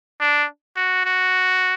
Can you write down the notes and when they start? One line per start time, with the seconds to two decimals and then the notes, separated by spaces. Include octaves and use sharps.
0.20 D4
0.76 F#4
1.05 F#4